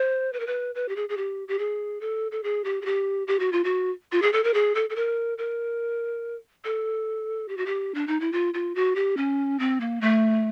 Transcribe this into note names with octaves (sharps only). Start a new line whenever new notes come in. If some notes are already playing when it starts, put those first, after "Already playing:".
Already playing: C5
B4
A#4
B4
B4
G4
G#4
G#4
G4
G4
G#4
A4
A4
G#4
G4
G#4
G4
G4
F#4
F4
F#4
F4
G#4
A4
A#4
G#4
A4
A4
A#4
A#4
A4
G4
F#4
G4
D4
D#4
E4
F4
F4
F#4
G4
C#4
C4
A#3
A3